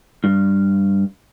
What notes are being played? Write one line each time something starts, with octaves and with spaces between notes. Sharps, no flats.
G2